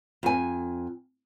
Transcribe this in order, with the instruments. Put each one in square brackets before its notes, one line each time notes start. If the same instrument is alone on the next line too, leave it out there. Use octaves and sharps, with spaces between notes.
[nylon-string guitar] F2 G#5